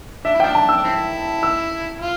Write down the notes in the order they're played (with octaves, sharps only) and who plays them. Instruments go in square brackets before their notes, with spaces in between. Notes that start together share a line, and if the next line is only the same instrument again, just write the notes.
[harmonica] D4 [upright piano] E5
[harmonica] E4
[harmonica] F3 D4 [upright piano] G5
[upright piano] A5
E6
[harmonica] D4
C4 E4
[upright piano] E6
[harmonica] F4